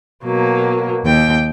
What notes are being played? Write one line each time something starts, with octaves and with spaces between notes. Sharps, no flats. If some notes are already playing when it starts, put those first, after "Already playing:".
B2 F#3 A#3
D#2 G5